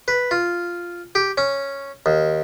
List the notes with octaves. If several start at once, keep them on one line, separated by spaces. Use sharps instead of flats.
B4
F4
G4
C#4
D#2